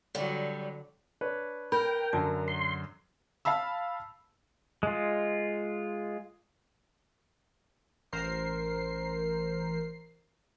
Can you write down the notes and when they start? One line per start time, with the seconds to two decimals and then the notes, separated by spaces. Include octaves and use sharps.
0.15 D3 F#3 G3
1.21 D4 B4 C#5
1.72 A#4 G5 B5
2.13 F#2 D3 F#3 A5
2.48 C6
3.45 F5 A5 B5 E6
4.83 G#3 F4
8.12 A1 A#4 C5 C7